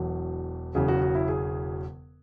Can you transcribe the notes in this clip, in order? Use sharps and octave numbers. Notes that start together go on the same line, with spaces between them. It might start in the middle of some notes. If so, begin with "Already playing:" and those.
Already playing: E1 E2 B2 F#3
E1 E2 C#3 F#3 G#4
F#4
F#4
E4
G#4